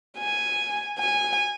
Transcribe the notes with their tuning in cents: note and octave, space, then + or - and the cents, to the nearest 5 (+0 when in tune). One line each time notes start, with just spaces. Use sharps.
G#5 -5
G#5 -15